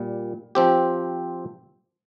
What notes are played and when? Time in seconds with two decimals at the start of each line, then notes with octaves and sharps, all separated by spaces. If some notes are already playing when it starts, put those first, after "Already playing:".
Already playing: A#2 G3
0.55 F3 C4 G4